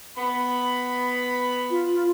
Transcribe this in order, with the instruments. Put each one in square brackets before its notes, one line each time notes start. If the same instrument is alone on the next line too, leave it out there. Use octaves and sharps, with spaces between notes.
[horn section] B3 B5
[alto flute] F4